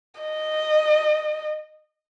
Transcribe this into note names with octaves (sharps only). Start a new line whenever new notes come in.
D#5